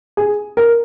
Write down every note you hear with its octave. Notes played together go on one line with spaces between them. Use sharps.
G#4
A#4